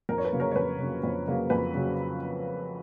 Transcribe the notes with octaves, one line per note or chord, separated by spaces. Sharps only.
F2 A#4
C#5
B4
C#3 F#3 A#3
A#4 C#5
C#5
F2 B4
C#3 F#3 A#3
F2
C#3 F#3 A#3
F2 B4
C#3 F#3